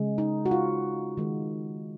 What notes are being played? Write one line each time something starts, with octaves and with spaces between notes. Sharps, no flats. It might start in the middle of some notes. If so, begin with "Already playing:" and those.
Already playing: C#3 G#3
D#4
F#4
F4
D#3 G#3